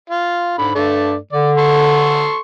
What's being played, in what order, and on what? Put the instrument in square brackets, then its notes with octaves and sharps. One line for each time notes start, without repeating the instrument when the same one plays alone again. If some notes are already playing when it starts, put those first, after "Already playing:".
[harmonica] F4
[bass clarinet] G#2 [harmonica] D3 B5
[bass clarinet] G2 [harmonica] A3 D5
[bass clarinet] D3 [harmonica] D5
[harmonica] A4 C6 C#6